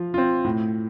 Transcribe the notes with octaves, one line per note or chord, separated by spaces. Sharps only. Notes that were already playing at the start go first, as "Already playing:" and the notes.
Already playing: F3 F4
C4 F4
A2